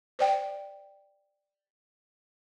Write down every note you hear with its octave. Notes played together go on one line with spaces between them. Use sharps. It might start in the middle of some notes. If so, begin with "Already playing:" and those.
C5 D5 G5